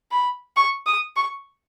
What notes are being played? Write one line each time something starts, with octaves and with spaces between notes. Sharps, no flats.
B5
C#6
D#6
C#6